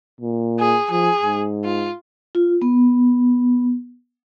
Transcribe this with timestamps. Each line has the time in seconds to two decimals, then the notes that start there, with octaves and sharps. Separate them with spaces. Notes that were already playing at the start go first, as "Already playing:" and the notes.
0.21 A#2
0.59 G#4
0.91 F3 G#4
1.22 G#2
1.64 F4
2.35 F4
2.62 B3